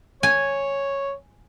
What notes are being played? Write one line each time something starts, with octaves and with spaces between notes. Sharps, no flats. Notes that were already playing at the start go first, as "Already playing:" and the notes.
C#5 G#5